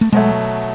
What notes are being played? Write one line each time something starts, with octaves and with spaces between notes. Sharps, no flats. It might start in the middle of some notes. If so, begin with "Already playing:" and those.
A3
B2 F#3 G#3 A3